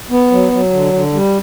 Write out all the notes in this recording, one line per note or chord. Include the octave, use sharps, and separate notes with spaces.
B3
F#3
F#3
D3
D3
G3